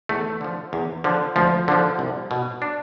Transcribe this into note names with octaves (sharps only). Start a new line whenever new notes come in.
E2 A3
D3 F3
E2
D3 F3
D2 F3
D3 F3
C2
B2
D4